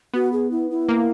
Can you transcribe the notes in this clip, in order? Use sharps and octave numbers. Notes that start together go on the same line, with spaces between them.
B3 F#4
G#4
E4
E4
A#3